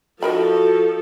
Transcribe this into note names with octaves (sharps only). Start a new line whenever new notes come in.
F3 D#4 F#4 A4 A#4 B5